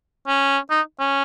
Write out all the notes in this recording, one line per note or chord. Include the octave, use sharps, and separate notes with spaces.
C#4
D#4
C#4